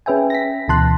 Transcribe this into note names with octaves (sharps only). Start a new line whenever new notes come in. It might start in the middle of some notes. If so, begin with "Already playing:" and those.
C#4 G#4 B4 E5 G5 G#5
A#6 B6
D2 B2 E3 A5 C6 F#6